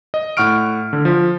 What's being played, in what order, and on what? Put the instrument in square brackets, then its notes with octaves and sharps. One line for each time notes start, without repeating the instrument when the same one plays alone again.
[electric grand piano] D#5
A2 F#5 C#6 F6 D7
D3
F3